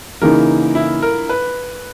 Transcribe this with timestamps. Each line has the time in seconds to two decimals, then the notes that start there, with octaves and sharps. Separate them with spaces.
0.21 C#3 E3 A#3 D#4 A#4
0.75 E4
1.02 A#4
1.29 B4